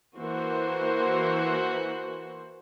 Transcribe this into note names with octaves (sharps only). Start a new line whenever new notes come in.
E3 A#3 F#4 C5